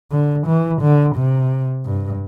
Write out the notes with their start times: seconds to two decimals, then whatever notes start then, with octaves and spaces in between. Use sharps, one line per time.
0.12 D3
0.47 E3
0.82 D3
1.16 C3
1.86 G2